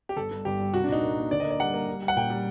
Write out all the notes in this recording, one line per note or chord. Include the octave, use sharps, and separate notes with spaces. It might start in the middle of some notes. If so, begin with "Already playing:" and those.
G4
G1 A4
G2
G1 G4
G2
C2 F#4
D4
A#2 D#4
A#3
A#3
D3 D5
D#5
A#3
D5
G3 F#5
A#3
G3
G3
F#5
A#2 G5
G3